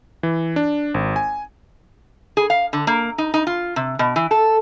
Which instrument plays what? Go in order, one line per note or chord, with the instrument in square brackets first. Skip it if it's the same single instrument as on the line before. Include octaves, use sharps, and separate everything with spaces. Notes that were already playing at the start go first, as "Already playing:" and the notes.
[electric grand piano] E3
D4
G#1
G#5
[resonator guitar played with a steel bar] G#4
F5
D3
A#3
D#4
D#4
F4
C3
B2
E3
A4